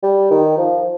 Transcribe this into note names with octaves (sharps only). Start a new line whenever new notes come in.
G3
D#3
F3